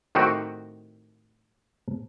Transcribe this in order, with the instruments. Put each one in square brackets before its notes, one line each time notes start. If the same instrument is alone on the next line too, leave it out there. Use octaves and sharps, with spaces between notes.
[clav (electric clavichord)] A2 D#3 C4 D#4 F#4 G4